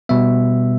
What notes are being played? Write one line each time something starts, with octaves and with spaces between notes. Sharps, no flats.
B2 G3 B3 E5